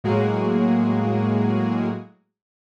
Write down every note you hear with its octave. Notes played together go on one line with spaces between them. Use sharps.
A2 F#3 G#3 A#3 F#4 G#4